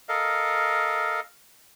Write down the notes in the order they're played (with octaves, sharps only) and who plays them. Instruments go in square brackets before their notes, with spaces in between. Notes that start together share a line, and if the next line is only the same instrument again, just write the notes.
[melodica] A4 A#4 D#5 F5